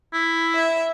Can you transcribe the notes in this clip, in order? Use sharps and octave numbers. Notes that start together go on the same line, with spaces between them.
E4
E5